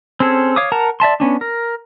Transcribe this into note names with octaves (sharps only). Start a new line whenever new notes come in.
C4 C#4 G#4 A4
C#5 F5 D6 D#6
A#4 F#5 A5 A#5
D5 E5 A5 C6
B3 C#4 D4
A#4